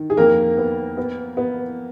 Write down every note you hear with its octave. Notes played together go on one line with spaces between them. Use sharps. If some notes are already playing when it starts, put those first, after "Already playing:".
Already playing: D#3
G#4
F2 A#3 A#4
B3
B3
B3